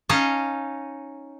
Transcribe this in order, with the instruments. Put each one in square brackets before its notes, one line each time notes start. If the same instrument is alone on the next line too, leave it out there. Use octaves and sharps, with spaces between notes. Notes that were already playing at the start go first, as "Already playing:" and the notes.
[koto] C#4 D#4 D#5 F5 A5